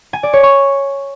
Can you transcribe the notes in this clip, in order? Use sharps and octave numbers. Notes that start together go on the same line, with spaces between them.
G#5
D5
C#5
C#6